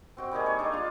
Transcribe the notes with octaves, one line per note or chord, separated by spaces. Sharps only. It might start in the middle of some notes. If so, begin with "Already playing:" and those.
C4 F#4 G5
G3 A#3 D#4 G#4
C#5
D4 A4 D#5
F4 F5